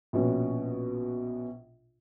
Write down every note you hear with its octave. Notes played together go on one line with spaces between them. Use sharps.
A#1 B2 C#4 B4